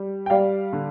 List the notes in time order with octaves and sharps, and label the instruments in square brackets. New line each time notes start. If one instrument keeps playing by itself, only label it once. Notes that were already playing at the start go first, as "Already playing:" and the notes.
Already playing: [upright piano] G3
G5
G3 D5 F5
D3